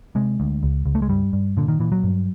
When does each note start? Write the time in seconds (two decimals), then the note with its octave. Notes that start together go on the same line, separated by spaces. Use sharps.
0.15 C3 G#3
0.40 D2
0.63 C#2
0.86 C#2
0.95 A3
1.02 G#3
1.09 G2 G3
1.33 G2
1.57 A#2 D3
1.68 D#3
1.80 A#2 E3
1.92 F#3
2.03 G2